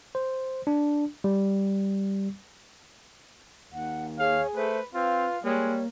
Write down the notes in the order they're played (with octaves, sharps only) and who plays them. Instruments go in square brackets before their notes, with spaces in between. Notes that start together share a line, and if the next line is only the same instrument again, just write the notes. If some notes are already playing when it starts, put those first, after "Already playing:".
[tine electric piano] C5
D4
G3
[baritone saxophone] D#2 [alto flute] F#5
[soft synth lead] G#4 [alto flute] C#5 [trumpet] F5
[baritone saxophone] A3 [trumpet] B4 [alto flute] C5
[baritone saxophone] C4 [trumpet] F4 [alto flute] B4 [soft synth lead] F5
[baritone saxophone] G3 [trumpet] G#3 [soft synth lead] A#3 [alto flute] C#5